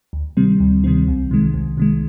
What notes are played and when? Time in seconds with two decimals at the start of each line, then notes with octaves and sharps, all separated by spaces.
0.13 D2
0.37 C3 D#3 G3 C4
0.60 D2
0.84 C3 D#3 G3 C4
1.08 C2
1.31 C3 D#3 G#3
1.54 C2
1.78 C3 D#3 G#3